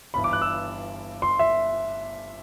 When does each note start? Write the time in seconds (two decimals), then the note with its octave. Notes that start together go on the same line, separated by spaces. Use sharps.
0.14 G1 G2 E3 B5
0.24 D6
0.33 F#6
0.42 E6
1.22 C6
1.39 E5